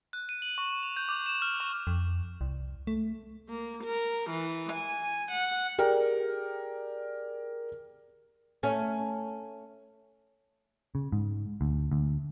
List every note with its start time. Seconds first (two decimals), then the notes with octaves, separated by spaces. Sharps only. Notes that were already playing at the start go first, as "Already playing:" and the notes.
0.13 F#6
0.29 D#7
0.42 F#7
0.58 C#6
0.83 F7
0.97 G6
1.09 D6
1.26 E7
1.42 F6
1.60 C#6
1.87 F2
2.41 C2
2.87 A3
3.49 A#3
3.84 A#4
4.30 E3
4.73 G#5
5.31 F#5
5.78 G4 G#4 A#4 D5 G5
8.63 A3 C#4
10.95 C#3
11.12 G#2
11.61 D2
11.92 D2